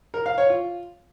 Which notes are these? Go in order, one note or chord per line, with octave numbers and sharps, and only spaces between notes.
A#4
F5
C#5
F4